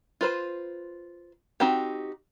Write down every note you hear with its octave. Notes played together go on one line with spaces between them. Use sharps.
F4 B4 C5
C4 D#4 F#4 G4